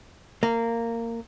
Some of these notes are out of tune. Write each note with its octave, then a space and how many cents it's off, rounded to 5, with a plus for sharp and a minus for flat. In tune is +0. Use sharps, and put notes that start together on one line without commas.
A#3 -15